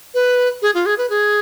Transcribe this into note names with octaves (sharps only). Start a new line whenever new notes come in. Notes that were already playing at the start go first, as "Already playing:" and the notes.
B4
G#4
F4
G#4
B4
G#4